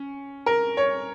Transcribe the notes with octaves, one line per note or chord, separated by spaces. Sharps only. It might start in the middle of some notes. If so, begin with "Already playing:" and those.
Already playing: C#4
A#4
C#5